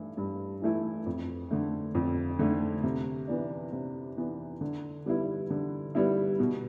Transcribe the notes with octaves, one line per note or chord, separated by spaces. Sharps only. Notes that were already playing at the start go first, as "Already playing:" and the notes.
Already playing: G2 E3 A3 E4
G2
E3 A3 E4
F2
D3 A3
F2
D3 A3
C3
E3 B3 D4
C3
E3 B3 D4
D3
G3 B3 E4
D3
G3 B3 E4
B2